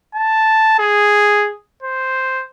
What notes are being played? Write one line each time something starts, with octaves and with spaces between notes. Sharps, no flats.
A5
G#4
C5